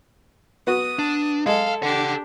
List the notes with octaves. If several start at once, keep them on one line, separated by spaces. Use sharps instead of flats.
B3 F#4 D#6
D4
G#3 A4 F5
D4 G4 A4 F#5